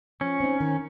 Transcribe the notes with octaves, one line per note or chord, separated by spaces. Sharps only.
F3 C#4
C4 D#4
D#3